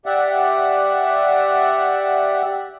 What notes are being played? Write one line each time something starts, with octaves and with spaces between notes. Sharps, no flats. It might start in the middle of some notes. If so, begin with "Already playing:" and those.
G4 D5 E5 F#5